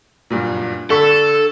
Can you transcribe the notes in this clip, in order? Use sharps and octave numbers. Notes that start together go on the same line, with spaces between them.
F#1 G2 A#2
D3 A4 C#6 B6